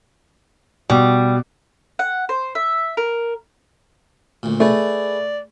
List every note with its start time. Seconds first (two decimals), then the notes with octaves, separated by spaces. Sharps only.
0.90 B2 G3
1.99 F#5
2.29 C5
2.55 E5
2.97 A#4
4.43 D2 A#2
4.60 A3 G#4 B4 D5